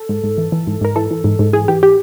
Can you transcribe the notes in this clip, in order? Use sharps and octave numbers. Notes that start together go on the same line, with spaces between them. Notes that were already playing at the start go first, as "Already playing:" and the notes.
Already playing: A4
G#2
G#2
E3
E3
G#2
G#2 A#4
E3 A4
E3
G#2
G#2
E3 G#4
E3 G4
G4